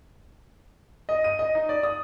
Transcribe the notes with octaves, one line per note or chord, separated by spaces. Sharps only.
D#5
D#7
D#5
D#4
D5
D#6